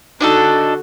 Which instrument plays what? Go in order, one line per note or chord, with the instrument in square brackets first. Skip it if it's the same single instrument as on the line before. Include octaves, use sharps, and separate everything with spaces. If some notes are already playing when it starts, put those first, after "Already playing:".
[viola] D3 F#4 [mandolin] D4 D#4 A4